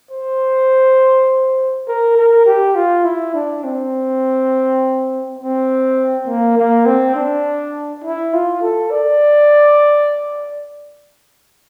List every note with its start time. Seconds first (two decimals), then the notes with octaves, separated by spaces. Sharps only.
0.11 C5
1.88 A#4
2.17 A#4
2.46 G4
2.76 F4
3.05 E4
3.35 D4
3.64 C4
5.39 C4
6.28 A#3
6.57 A#3
6.86 C4
7.15 D4
8.04 E4
8.34 F4
8.62 A4
8.91 D5